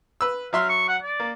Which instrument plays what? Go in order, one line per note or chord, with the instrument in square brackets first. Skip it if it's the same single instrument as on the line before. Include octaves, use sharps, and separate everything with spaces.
[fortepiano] B4 E6
[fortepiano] F#3 E5 C6 [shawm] F5
[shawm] C#6
F#5
D5
[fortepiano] A#3